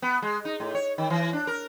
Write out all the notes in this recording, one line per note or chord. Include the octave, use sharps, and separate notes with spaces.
B3
G#3
D#4
A2
C#5
D#3
E3
D4
A#4